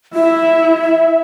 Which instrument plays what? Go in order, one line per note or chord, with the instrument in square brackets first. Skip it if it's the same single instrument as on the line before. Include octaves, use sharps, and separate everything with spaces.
[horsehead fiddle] E4 [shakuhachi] E5